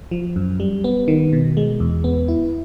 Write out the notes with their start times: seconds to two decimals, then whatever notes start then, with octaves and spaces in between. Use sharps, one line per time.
0.11 F3
0.36 F#2
0.60 G3
0.84 B3
1.08 D#3
1.33 B2
1.57 G#3
1.80 E2
2.04 B3
2.28 E4